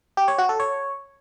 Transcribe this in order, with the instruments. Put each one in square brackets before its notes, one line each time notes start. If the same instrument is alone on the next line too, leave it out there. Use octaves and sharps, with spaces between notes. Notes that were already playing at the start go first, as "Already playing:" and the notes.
[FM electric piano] G4
C#5
F#4
A4
C#5